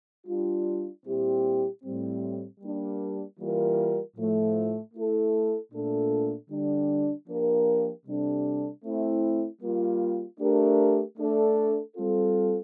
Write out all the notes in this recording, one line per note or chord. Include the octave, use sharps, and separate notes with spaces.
G3 D4 F4
A#2 G3 C4 E4 G4
A2 G3 C4
G3 A#3 D4
E3 G3 A#3 F4 A#4
A2 F3 A3
A3 E4 A4
A#2 A3 D4 A4
D3 G3 D4
F3 A#3 D4 G4 A#4
C3 G3 D4 A4
A3 C4 E4
G3 A#3 F4
A3 D4 G4 A#4
A3 D4 A4
G3 C4 F4 A4